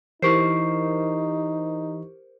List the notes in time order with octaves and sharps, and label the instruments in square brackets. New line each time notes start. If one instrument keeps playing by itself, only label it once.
[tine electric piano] E3 [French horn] D#4 [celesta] E4 C#6 C7 [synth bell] G4 A#4 C5